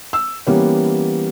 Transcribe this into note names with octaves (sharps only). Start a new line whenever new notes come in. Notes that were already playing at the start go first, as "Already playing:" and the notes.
E6
E3 G3 A#3 B3 C#4